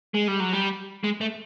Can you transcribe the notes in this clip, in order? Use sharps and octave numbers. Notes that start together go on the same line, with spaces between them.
G#3
G3
F#3
G3
G#3
A3